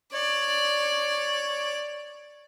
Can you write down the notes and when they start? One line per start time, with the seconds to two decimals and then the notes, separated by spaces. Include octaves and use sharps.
0.13 C#5 D5